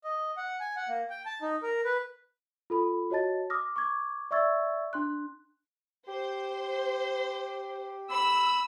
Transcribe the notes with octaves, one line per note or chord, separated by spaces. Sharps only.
D#5
F#5
G#5
F#5
A#3
G5
A5
D#4
A#4
B4
F4 A4 B5
F#4 C#5 D#5 A5 A6
D6 D#6 F6 A#6
C#6 D6 G#6
D5 E5 C#6 E6 G#6 A6
D4 C6 F#6
G4 C5
B5 E6